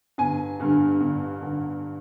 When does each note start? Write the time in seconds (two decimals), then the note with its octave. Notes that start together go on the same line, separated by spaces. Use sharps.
0.18 G1 G#5
0.60 G2 D3
1.00 G1
1.42 D3